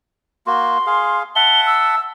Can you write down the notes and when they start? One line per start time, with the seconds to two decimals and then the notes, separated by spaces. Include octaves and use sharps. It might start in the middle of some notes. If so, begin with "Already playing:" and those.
0.47 A#3 F#4 C6
0.86 G#4 F5
1.36 E5 F#5 A5 G7
1.67 E6